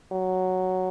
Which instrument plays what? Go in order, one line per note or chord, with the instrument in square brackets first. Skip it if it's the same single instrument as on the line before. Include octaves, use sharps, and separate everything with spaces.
[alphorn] F#3